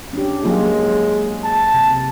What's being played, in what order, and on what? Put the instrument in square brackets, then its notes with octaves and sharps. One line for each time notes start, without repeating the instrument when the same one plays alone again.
[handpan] C#4 D4 G4
[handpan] F#3 A#3 F4 [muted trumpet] G#3
[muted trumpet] A5
[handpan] C3